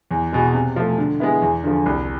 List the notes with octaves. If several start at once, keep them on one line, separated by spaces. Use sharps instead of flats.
E2
B2 G#3
C3
F3 A3
D3
G#3 B3 E4
E2
D3 F3
C2